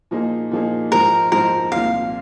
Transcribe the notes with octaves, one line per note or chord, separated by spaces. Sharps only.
A#2 F3 A#3 D#4 G#4
A#2 F3 A#3 D#4 G#4
G#2 F3 G#3 D#4 A#4 C5
G#2 F3 G#3 D#4 A#4 C5
C2 A#2 F3 F5